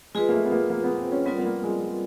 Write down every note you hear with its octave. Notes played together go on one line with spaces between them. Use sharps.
G#3 F4 G#4 B4
A#3
A3
B3
A#3
A#3
B3
C4
C#4
G3 B3 C4 F4 A#4 D5
B3
A#3
G#3
G#3